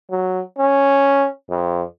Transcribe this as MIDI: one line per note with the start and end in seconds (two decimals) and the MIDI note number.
0.11 0.41 54
0.59 1.28 61
1.50 1.82 41